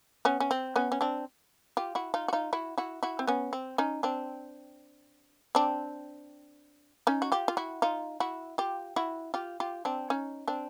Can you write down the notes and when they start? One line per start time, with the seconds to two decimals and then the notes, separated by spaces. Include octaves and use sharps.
0.25 B3 C#4
0.40 C#4
0.51 C4
0.76 B3 C#4
0.92 C#4
1.01 C4 D4
1.77 F4 G4
1.95 E4 F#4
2.14 D#4 F4
2.28 F#4
2.33 D#4 F4
2.53 E4 F#4
2.78 E4 F#4
3.03 E4 F#4
3.19 C4
3.27 B3 C#4
3.53 C4
3.78 C#4 D#4
4.03 C4 D4
5.55 C4 D4
7.07 C#4 D#4
7.22 F#4
7.32 F4 G4
7.48 F4
7.57 E4 F#4
7.82 D#4 F4
8.20 E4 F#4
8.58 F4 G4
8.96 E4 F#4
9.34 F4 G4
9.60 F4 G4
9.85 C4 D4
10.10 C#4 D#4
10.48 C4 D4